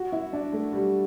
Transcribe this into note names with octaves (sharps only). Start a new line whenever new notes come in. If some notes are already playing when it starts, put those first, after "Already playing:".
Already playing: F#4
E4
D4
A3
G3